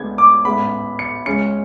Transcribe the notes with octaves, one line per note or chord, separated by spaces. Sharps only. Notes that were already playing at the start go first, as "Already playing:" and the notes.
Already playing: D2 D3 G#3 B3 G#6
D6
A1 G#2 G#3 B3 B5
C#7
C#2 C#3 G#3 C#4 C#7